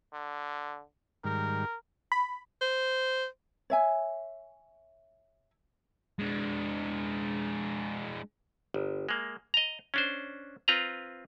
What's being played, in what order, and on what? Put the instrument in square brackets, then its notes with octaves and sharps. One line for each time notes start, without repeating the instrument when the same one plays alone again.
[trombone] D3
[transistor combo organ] G#2 D#3 G3 [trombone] A#4
[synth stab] B5
[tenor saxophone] C5
[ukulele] C#5 E5 G#5
[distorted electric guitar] G#3 D4
[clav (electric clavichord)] G1
G#3 A#3
D#5 A#5
C#4 D4 C5
C4 F4 B4 A#5